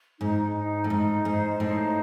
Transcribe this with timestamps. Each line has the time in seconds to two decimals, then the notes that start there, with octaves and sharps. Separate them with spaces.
0.20 G#2 D#4
0.55 D#4
0.84 A2
0.90 G#2 D#4
1.25 G#2 C5
1.60 A2 D#4